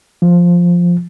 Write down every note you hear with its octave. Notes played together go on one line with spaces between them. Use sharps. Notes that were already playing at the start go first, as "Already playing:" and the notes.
F3